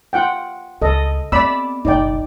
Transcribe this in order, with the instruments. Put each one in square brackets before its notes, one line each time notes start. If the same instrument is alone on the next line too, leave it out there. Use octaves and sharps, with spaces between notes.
[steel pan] F4 F#5 G5
[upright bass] C#2 [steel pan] A4 D#5
[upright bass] B3 C4 [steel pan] D5 B5 E6
[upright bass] F#1 B1 [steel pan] D#4 D5 G5